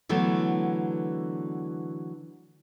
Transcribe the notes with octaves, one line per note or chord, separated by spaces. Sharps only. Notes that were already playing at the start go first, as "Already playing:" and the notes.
D3 E3 F#3 A3 B3